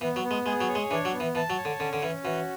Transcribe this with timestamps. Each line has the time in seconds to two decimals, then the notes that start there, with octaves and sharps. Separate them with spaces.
0.01 E3 B3
0.16 F#3
0.24 B3
0.31 G#3
0.46 G#3 G#4
0.61 F#3
0.68 C#5
0.75 G#3
0.90 E3 D4
1.05 F#3
1.13 B3
1.20 E3
1.35 E3 A5
1.50 F#3
1.58 C#5
1.65 D3
1.80 D3 C#4
1.93 D3
2.02 E3 C#4
2.24 E3 F#4